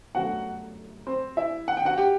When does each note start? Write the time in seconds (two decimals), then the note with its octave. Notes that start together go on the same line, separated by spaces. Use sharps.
0.15 G1 F#2 D3 F#3 A3 F#4 F#5
1.07 C4 C5
1.37 E4 E5
1.68 F#5
1.77 G5
1.85 F#4 F#5
1.98 G4 G5